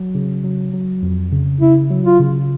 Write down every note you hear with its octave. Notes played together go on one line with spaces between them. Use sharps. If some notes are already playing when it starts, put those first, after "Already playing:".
Already playing: F#3
C#3
F#3
F#3
F2
C#3
C#3 E4
F#3
F4
C#3